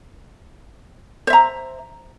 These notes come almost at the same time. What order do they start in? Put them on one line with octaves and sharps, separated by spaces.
C5 E5 A#5